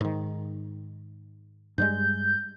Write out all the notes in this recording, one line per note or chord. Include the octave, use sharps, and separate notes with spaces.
G#2 D#3
G2 G3 G#3 G6